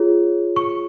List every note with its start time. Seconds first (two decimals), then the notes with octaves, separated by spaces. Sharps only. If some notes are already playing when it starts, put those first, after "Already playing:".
Already playing: F4 G#4 C#5
0.56 C#6